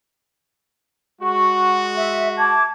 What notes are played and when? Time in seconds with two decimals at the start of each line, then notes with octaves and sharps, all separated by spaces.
1.21 G#3 F#4 C#6
1.96 E5
2.38 A5 D6 G#6